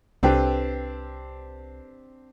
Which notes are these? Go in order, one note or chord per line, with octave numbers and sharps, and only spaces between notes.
C2 C4 D4 G4 A4 B4 G5